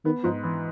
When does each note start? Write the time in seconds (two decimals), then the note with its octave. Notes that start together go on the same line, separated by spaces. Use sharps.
0.05 D#3 B3
0.24 G#2 F3
0.43 E3